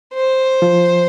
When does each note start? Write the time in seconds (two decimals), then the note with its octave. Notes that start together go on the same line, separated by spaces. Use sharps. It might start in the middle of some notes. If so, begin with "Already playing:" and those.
0.14 C5
0.62 F3